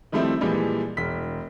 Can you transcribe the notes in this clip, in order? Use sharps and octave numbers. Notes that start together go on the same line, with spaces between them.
D#3 F3 G3 A3 C4 E4
A#2 E3 F3 G3 G#3
E1 B6